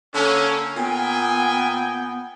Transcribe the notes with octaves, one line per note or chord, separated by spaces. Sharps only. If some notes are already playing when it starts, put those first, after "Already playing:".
D3 A#3 C#4
A#2 B3 G5 G#5